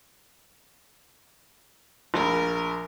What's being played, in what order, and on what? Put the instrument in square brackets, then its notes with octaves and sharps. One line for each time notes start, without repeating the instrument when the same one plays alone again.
[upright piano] A#1 B5 [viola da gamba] A#4